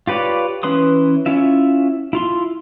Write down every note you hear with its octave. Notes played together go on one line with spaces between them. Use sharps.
F4 G4 B4 C#5 D5
E3 C#4 B4 C6 D#6
C#4 E4 F4 E5
E4 F4 C6